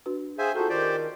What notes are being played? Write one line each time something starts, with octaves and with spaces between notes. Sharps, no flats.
D4 F#4 B4
G#4 C5 E5 F5 G5 G#5
D#4 F4 F#4 G#4 A4 C5
D#3 G4 C5 D5